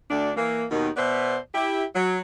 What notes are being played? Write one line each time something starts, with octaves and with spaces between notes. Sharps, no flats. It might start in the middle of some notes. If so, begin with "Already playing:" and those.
D2 D4
E3 A#3
D#2 B2 D#3
B2 B3 C5 D5 E5
E4 G4
F#3